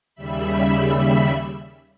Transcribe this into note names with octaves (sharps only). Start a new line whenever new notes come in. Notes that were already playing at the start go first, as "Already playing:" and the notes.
D#2 C#3 G3 E5 B5